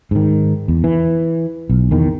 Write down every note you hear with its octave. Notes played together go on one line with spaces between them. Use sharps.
G#2 D#3
E2
E3
B1
E2 D#3